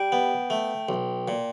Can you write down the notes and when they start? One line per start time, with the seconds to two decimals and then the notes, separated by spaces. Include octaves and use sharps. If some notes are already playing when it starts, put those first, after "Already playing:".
Already playing: G3 G5
0.12 B3
0.50 A3
0.89 B1
1.28 A#2